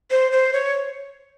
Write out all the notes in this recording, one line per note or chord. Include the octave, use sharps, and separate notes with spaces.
C5
C5
C#5